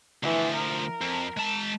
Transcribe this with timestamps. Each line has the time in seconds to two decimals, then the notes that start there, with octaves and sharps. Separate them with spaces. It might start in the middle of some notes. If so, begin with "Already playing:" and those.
0.23 D2 E3 F3
0.56 A#4
1.01 F2
1.37 G#3 A5